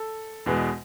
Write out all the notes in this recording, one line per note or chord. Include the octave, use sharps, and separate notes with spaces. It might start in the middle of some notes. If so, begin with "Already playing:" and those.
Already playing: A4
E2 B2 G#3